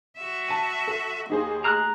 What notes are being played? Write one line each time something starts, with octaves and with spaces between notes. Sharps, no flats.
F#4 E5
A5 D#7
A4
D#2 A#3 D#4 G#4 C5
A3 A#5 F6 F#6